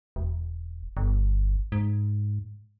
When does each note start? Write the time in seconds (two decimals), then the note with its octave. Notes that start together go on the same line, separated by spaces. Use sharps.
0.16 E1
0.97 G1
1.72 G#2